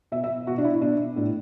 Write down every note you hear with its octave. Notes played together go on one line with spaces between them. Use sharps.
B2 E5
E5
B2 F#4
D4
E4
B2 D4
A2 D4